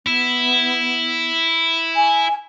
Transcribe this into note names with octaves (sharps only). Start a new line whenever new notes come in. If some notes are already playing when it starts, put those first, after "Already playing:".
B3 E4
G#5